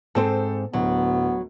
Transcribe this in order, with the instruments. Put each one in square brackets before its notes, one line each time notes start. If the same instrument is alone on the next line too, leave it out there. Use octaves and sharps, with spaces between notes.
[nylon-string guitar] G#2 C4 C5 [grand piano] A4
[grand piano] D1 [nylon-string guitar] F#3 [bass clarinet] B3